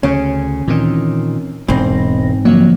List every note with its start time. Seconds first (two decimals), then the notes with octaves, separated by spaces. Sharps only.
0.03 D2 C#3 C#4
0.68 A#2 D#3 E3 C4
1.68 E1 G#2 C4 B5 A#6
2.45 D3 F3 F#3 A#3